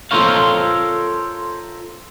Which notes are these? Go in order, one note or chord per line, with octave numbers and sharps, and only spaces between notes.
F4 A4 A#4 C5 C#5 F5